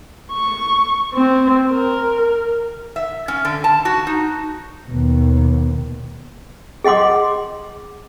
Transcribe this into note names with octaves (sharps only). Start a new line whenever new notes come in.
C#6
C4
A#4
E5
C#4
D3
A5
F#4
D#4
D#2 B2
G#4 D#5 F#5 C6 D6